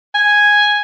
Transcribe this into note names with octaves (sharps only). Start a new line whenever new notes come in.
G#5